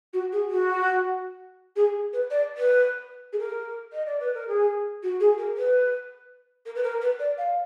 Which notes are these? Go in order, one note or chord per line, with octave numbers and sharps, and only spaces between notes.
F#4
G#4
F#4
G#4
B4
D5
B4
G#4
A#4
D#5
D5
B4
A#4
G#4
F#4
G#4
A#4
B4
A#4
B4
A#4
B4
D5
F5